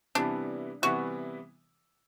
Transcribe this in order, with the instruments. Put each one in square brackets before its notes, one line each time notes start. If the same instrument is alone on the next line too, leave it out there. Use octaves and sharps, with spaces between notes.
[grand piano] C3 E3 G3 B3 E4 [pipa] D4
[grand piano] C3 E3 G3 B3 E4 [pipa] F#4